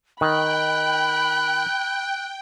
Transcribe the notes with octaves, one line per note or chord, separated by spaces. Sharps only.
D#3 G5 B5 F#6